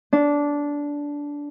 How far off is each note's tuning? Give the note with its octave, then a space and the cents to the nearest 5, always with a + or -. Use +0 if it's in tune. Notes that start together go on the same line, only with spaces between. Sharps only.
D4 -15